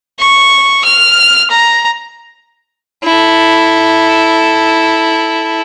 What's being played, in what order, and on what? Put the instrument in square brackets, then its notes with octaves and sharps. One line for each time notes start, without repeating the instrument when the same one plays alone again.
[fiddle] C#6
F6
A#5
E4 A4